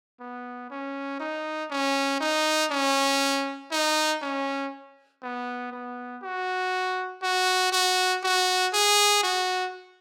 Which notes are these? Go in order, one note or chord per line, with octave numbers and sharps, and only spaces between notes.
B3
C#4
D#4
C#4
D#4
C#4
D#4
C#4
B3
B3
F#4
F#4
F#4
F#4
G#4
F#4